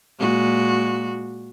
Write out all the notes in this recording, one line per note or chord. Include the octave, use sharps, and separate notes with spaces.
A#2 G#3 F#4